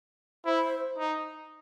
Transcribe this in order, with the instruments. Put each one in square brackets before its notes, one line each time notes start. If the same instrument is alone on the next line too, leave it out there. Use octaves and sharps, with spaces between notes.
[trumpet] E4 [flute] C5
[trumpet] D#4